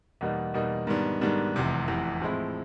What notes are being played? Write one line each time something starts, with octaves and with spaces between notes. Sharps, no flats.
E2 B2 G3 A#3 D#4
E2 B2 G3 A#3 D#4
G#2 D#3 G3 B3 D4
G#2 D#3 G3 B3 D4
F1 E2 C3 E3
F1 E2 C3 E3
A2 F3 G#3 C4 E4